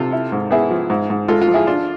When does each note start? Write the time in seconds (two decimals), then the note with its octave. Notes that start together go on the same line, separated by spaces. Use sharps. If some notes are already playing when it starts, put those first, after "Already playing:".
Already playing: C3 F4 A4
0.12 E4
0.32 G#2
0.51 B3 E4 G#4
0.70 F3
0.90 G#2
1.10 G#2
1.28 G#3 F4 A4
1.42 F4
1.48 F3
1.54 E4 G#4
1.67 D4 F4